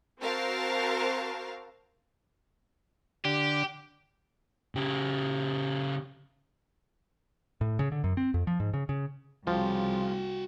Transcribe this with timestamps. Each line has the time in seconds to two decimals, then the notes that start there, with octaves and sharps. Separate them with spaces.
0.20 C4 F#4 A#4 C5 F5 A5
3.25 D3 G4
4.75 C#3 G4
7.61 A2
7.79 C#3
7.92 D3
8.04 F#2
8.17 C4
8.34 F2
8.47 F3
8.60 G#2
8.74 C#3
8.89 C#3
9.47 C2 C#3 F3 F4 F#4 G5